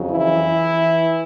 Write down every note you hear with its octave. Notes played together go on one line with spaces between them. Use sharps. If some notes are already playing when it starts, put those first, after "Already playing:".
Already playing: F2 C#3 F#3
E3 E4